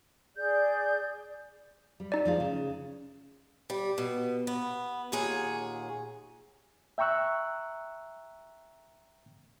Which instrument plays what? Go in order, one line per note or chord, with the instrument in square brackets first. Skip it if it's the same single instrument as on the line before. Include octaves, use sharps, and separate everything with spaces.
[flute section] G#4 D5 G6
[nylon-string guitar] G3
[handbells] D#4 D5
[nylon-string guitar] F3 G#3 F4
C#3
[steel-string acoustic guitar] G3
B2
B3
D#2 A#2 G#4 C#5 F#5
[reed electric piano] E5 G5 A#5 C#6 E6 F#6